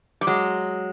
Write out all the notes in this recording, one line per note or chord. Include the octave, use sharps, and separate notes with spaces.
G3
F#3 G#3